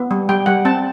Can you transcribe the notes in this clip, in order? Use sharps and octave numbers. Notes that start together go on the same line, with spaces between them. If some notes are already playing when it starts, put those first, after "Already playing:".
Already playing: B3
G3
G3 G5
G3 F#5
C4 A5